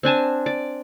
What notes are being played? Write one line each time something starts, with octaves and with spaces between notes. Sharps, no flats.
C4 D4 G#5 A5
D5